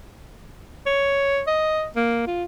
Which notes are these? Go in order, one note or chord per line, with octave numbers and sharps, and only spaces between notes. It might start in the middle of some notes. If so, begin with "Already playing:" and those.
C#5
D#5
A#3
F4